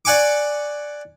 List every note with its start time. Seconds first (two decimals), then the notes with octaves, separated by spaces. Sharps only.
0.05 D5 F#5 G#5 C#6 D6